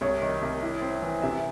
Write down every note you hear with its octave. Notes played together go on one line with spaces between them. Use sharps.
C2 C#5
D#3
C2
E4
C4
E3
C3 E5